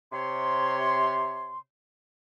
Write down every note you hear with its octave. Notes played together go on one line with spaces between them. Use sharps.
C3 C#5 C6